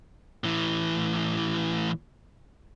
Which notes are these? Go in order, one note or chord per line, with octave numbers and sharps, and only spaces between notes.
A2 E3